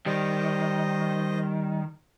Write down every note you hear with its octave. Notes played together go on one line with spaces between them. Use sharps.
D#3 G3 C5 D#5